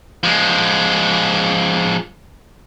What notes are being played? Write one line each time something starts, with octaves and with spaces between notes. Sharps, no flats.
F3 G#3